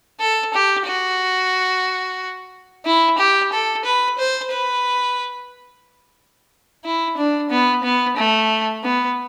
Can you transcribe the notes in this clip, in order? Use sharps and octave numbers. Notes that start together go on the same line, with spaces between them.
A4
G4
F#4
E4
G4
A4
B4
C5
B4
E4
D4
B3
B3
A3
B3